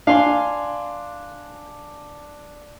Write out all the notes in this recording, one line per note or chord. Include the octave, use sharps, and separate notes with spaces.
D4 F5 G#5 C6